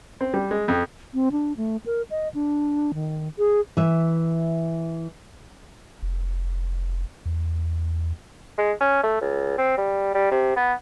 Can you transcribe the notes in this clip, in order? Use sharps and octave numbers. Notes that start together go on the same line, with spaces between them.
C4
G3
G#3
F2
C4
D4
A3
A#4
D#5
D4
D#3
G#4
E3 E5
F1
E2
G#3
C#4
A3
C#2
C4
G3
G3
C3
B3